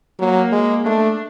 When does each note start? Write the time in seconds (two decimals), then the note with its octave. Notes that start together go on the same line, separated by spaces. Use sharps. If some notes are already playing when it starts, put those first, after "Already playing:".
0.19 F#3 A#3
0.52 G#3
0.85 A3 D4